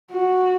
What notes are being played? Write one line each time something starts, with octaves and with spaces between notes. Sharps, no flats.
F#4